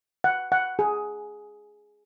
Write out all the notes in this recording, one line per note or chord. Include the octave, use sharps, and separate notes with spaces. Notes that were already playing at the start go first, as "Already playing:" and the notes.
F#5
F#5
G#4